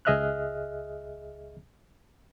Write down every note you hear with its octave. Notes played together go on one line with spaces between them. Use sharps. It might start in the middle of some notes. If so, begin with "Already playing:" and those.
C#2 G#4 D#5 E5 F6 F#6